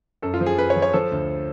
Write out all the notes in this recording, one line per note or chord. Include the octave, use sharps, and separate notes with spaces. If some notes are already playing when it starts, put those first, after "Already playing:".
F#2 A4
F4
F3
G#4
F#2 B4
C#5
F3
C#5
F3 A4
D2